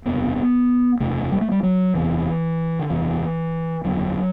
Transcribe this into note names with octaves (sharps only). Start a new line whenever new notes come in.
F#1 E2 C3 B3
F#1 E2 C3 A3
G3
A3
G3
F#3
F#1 E2 C3 E3
D3
F#1 E2 C3 E3
F#1 E2 D3 F#3